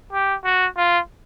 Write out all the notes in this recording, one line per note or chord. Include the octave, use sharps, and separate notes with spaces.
G4
F#4
F4